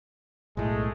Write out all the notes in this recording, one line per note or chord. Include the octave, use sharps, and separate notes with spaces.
B1 A2 G#3 A3